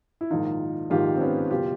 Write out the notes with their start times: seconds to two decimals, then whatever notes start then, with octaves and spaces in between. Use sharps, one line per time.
0.21 E4
0.31 A#1 G#2 D#3 D#4 F4
0.90 A#1 G#2 D#3 F4 G4
1.16 C4
1.21 B3 C#4
1.50 F#1 B2 F4 G4